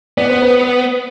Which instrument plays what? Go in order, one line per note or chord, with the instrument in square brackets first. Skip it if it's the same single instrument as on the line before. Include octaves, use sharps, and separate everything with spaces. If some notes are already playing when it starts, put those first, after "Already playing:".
[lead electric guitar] B3 [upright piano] D5
[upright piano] C5
B4